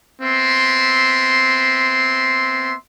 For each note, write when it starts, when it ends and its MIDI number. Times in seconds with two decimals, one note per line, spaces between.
0.22 2.75 59
0.22 2.75 60
0.22 2.75 76
0.22 2.75 84